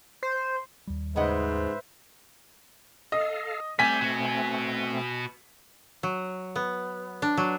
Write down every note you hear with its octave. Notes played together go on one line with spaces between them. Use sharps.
C5
D#2 G3
G#2 C#3 B4 C5 D#5 E5 F#5
A4 D#5 F5
A3 C4 D5 G5 G#5 B6
B3 F#4
F#3
B3
D4
F#3